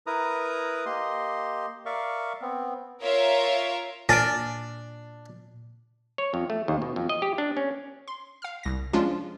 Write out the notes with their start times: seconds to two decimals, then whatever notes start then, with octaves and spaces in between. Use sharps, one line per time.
0.07 E4 A#4 B4 A#5 D#6
0.86 A#3 G4 D#5 C6
1.86 A#4 D5 E5 F5 C#6
2.42 B3 C4
3.03 F4 A#4 C#5 E5 F5
4.09 A#2 D4 G#5 F6 A6 D7
6.18 C#5
6.34 F2
6.50 A3
6.68 D#2
6.82 B2
6.96 F2
7.09 D#5
7.22 G4
7.38 D4
7.57 C#4
8.08 C6
8.42 F5 F6
8.63 C2 A#6
8.93 F3 G#3 C#4 D4 F4